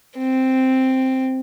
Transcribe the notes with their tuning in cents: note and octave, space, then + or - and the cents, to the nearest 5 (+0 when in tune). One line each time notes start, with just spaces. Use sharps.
C4 +0